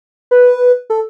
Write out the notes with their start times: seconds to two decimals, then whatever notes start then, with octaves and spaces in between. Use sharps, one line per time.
0.31 B4
0.90 A4